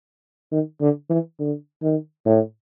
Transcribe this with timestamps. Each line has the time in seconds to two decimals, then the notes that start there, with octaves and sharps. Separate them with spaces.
0.52 D#3
0.81 D3
1.10 E3
1.39 D3
1.82 D#3
2.26 A2